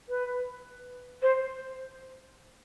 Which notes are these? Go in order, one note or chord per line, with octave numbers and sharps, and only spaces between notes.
B4
C5